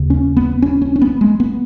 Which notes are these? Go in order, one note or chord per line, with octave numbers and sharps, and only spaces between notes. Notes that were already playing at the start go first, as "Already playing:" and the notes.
Already playing: D#2 C#3
C#4
B3
C#4
C#4
C#4
B3
G#3
B3